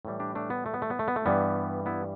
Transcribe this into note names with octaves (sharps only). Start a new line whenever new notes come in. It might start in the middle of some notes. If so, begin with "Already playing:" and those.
A2 E3 G3
D4 G4
A3 D4
B3
A3
B3
A3
B3
A3
B3
A3
G2 E3 G3 B3
B3 E4